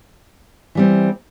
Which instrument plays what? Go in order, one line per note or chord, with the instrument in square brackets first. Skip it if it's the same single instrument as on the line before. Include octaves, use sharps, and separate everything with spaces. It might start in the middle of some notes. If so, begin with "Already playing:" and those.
[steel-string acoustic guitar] E3 G3 C4